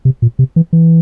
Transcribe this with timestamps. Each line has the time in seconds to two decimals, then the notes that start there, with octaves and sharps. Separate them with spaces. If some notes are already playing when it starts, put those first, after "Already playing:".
0.05 C3
0.22 A#2
0.39 C3
0.56 E3
0.73 E3